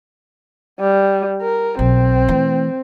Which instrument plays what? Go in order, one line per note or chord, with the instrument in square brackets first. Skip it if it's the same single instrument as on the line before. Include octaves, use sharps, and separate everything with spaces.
[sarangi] G3
A#4
[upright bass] B1 [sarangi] C4
[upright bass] E3 A3